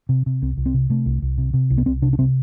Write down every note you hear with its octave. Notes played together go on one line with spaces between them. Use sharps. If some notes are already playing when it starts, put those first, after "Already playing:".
C3
C3
C2 C4
C2
C4
C3
C3 A3
C2
C2
C3
C3
C2
B3
C2 C4
C3 D4
D4
C3 C4